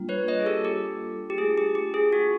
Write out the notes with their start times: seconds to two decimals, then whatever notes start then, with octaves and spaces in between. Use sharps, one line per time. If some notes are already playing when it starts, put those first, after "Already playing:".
Already playing: G3 A#3 D4 F4
0.09 B4 C#5
0.28 C#5 D#5
0.40 G#4
0.46 G4 A4
0.65 G4 A4
1.30 G4
1.38 A3 D4 F4 G#4
1.58 G4
1.75 G4
1.94 G#4
2.13 F#4